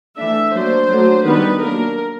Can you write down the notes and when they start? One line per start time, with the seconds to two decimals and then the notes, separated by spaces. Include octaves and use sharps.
0.18 E3 A3 D4 E5
0.54 F#3 A#3 D4 C5
0.90 F#3 A3 D4
1.26 D#3 G3 B3 D4 B4
1.62 F#3 A#3 D4 A#4